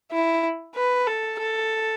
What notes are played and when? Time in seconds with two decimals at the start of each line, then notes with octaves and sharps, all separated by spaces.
0.12 E4
0.75 B4
1.07 A4
1.39 A4